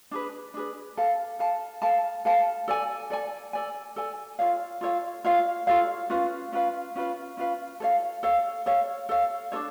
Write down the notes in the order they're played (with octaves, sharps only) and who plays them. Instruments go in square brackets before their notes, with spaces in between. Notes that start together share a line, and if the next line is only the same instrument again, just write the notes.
[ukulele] D4 G#4 B4
D4 G#4 B4
A4 F5 A5
A4 F5 A5
A4 F5 A5
A4 F5 A5
A4 D5 G#5
A4 D5 G#5
A4 D5 G#5
A4 D5 G#5
F4 A4 C#5 F5
F4 A4 C#5 F5
F4 A4 C#5 F5
F4 A4 C#5 F5
C#4 F4 B4 F5
C#4 F4 B4 F5
C#4 F4 B4 F5
C#4 F4 B4 F5
A4 C#5 F5
A4 C#5 F5
A4 C#5 F5
A4 C#5 F5
D4 F4 A4 C#5